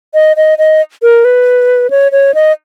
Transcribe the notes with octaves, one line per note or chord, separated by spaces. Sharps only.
D#5
D#5
D#5
A#4
B4
C#5
C#5
D#5